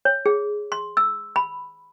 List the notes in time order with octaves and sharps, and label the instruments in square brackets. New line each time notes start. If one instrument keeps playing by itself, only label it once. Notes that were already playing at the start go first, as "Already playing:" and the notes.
[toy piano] C#5
G#4
C6
E6
B5